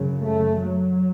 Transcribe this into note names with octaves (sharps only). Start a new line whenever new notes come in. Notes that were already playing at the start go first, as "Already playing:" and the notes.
Already playing: F#2 C#3 F#3
A3
F#3